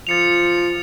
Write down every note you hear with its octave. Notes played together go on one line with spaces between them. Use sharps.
F3 A6 C#7 F7